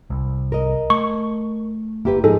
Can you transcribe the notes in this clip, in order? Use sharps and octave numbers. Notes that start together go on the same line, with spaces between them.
C2
A#4 D#5
A3 C#6
F#1 A#3 E4 G4 B4
G#2 F3 D#4 G#4 A4